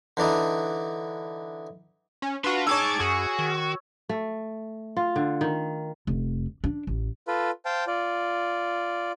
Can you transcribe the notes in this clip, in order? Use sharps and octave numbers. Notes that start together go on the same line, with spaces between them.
D3 E3 D4 D#4
C#4
D4 F#4 B4 F5 C6
D#4 G#4 C#5 A5 D6 E6 G#6
F#2 F#4 G#4
D#3
A3
F4
D3
D#3
F1
D4
A1
F4 A4 B4
C5 F5 G5 A5
F4 D5